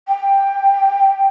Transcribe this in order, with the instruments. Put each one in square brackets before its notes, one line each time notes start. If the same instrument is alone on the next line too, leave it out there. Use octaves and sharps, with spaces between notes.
[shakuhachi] G5